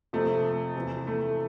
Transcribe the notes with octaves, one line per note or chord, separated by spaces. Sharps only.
F2 C3 F3 A3
E2 C3 E3
A3